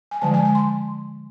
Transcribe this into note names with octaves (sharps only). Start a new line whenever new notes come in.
G#5
D3 F3 G#3 A5
G#5
G#5
C6